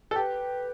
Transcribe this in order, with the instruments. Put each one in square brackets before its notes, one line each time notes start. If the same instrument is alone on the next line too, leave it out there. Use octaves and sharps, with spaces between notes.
[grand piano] A4
[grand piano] G4 [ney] B4